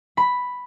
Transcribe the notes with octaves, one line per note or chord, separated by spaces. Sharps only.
B5